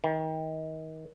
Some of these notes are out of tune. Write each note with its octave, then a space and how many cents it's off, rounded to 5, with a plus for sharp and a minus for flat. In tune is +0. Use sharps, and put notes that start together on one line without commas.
D#3 +30